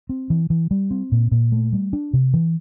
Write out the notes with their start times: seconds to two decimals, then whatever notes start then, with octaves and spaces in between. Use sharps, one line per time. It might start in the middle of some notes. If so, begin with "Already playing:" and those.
0.09 C4
0.30 E3
0.50 E3
0.71 G3
0.91 C4
1.12 A#2
1.31 A#2
1.52 A3
1.73 G3
1.93 D4
2.13 C3
2.34 E3